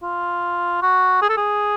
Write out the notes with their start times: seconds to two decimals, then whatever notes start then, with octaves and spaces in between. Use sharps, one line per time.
0.03 F4
0.82 F#4
1.22 G#4
1.29 A4
1.37 G#4